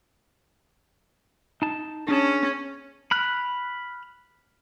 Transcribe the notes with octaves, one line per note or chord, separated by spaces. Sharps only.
D#4 A5
C#4 D4 G#4 A5
B5 F6 F#6